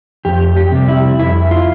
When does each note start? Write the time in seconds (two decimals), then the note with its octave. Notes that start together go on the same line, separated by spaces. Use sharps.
0.25 F2 G4
0.57 G4
0.72 C3 G3
0.88 E4
1.20 F2 E4
1.51 F4